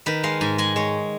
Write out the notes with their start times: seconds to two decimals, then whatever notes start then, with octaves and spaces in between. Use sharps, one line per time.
0.06 D#3 B4
0.23 G#3 F5
0.41 G#2 G#5
0.58 G#3 G#5
0.76 G#3 C#5